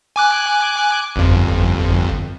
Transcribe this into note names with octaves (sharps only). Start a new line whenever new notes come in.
G#5 D6 F#6
G1 F2